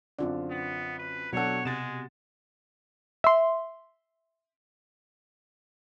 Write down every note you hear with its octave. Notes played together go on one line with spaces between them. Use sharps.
F#2 D3 C4 F4 D5
B3
B4
B2 F#3 D4 A4 C#5 F#5
C3 G#3 A6 E7
E5 C6